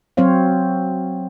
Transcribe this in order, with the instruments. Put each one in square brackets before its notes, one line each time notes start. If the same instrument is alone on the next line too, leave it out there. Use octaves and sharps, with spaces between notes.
[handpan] F#3 C4 C5 C#5 F5